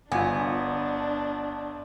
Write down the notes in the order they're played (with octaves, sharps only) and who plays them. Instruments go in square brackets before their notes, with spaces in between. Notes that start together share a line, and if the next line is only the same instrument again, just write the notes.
[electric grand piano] G1 [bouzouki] B3 [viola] D4 [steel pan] F4 G#5